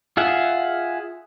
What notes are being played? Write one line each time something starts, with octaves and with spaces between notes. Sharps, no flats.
F4 G#4 E5 F#5